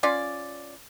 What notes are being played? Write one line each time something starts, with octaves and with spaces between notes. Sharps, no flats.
C#4 F4 D5